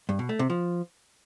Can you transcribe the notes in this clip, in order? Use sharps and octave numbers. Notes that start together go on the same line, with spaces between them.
G2
B2
A3
C3
F3